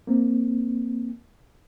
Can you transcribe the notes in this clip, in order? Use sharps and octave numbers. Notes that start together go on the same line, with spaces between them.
A#3 C4